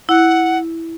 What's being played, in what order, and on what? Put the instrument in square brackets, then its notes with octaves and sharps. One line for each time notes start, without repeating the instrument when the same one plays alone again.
[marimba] E4 [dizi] F#5